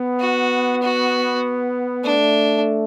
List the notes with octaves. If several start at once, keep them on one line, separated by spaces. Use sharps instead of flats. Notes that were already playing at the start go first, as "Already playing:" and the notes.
Already playing: B3
F#4
F#4
A3 D4